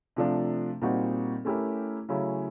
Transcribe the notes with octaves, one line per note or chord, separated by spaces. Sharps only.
C3 F3 A3 D4
A#2 G3 C4 D#4 F#4
A3 C#4 E4 G4 A#4
C#3 F#3 A3 C#4 E4